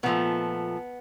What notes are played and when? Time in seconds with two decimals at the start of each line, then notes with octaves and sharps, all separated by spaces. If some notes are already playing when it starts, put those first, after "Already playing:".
0.03 A#2 F3 A3 B3